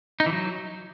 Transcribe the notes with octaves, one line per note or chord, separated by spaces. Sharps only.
D#4
E3
F#3